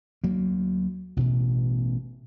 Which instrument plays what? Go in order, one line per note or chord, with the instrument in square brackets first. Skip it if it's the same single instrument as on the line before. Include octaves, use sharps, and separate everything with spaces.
[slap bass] D2 F#3 A#3
A1 B2